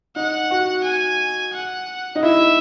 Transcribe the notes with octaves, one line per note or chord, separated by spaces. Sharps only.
D#4 F#5
F#4
G#5
F#5
D#4
E4 E5